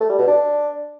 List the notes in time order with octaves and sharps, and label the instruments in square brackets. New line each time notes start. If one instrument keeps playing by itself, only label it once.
[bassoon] A3
G3
B2
D4